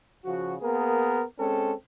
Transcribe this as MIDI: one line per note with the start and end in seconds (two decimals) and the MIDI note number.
0.25 0.55 49
0.25 0.55 53
0.25 0.55 66
0.61 1.22 58
0.61 1.22 59
0.61 1.22 68
0.61 1.22 70
1.39 1.72 56
1.39 1.72 60
1.39 1.72 61
1.39 1.72 69